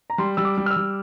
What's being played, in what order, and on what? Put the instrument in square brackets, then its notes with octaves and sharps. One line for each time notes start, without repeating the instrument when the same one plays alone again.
[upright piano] A#5
[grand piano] G3 [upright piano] C6
[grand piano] G3 [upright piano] E6
[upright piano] D6
[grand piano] G3
[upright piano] F6
E6
[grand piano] G3